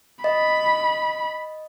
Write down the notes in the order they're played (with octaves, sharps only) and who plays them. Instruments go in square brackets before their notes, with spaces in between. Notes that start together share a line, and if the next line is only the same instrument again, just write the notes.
[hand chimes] D#5 [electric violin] B5